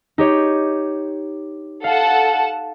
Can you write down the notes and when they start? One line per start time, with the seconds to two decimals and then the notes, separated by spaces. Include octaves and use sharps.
0.18 D#4 G4 C#5
1.84 A4 F5 F#5 A5